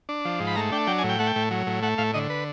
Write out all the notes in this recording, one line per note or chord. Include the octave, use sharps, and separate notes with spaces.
D4
F3
G#2
B5
A3 A#5
D4 G5
F#3 G5
G#5
A2
G5
A3 F#5
G5
A2
F#3
A2
A3 F#5
A2 F5
D3 D#5
B4